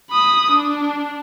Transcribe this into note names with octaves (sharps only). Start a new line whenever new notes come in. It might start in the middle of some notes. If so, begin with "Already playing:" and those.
B5 D#6
D4